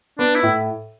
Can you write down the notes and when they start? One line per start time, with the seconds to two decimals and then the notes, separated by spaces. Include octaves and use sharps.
0.19 B3 D4
0.35 E4
0.43 A2